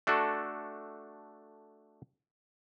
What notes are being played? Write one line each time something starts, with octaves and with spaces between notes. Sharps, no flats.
A3 D4 F#4 A4